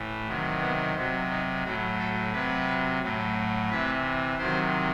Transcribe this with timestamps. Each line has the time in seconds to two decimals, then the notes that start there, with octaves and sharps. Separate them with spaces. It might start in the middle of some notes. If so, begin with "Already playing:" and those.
Already playing: A2 E3
0.27 C3 D#3 F#3
0.61 B3
0.95 C3 F#3 C4
1.30 D#4
1.64 A2 F#3 F#4
1.99 A4
2.33 C3 F#3 B4
3.02 A2 F#3
3.70 C3 E3 B4
4.38 C3 D#3 F#3 C5